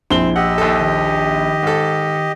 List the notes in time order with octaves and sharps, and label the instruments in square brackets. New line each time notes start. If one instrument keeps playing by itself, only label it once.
[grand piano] A#1 G7 [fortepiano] C4 [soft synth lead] E4
[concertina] G4 D#5 [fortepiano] F#5 [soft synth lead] E6
[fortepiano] D#2 A4
[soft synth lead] D#3
[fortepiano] G#2 A4